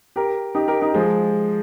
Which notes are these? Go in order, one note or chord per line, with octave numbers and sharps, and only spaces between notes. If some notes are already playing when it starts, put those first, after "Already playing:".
G4 A#4
D#4 G4
G4 A#4
D#4 G4
F3 G#3